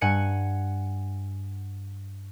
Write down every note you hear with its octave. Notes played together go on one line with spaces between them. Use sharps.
G2 F#5 G#5 C#7